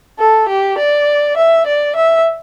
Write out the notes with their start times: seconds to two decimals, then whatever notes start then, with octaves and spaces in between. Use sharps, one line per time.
0.19 A4
0.48 G4
0.78 D5
1.37 E5
1.66 D5
1.96 E5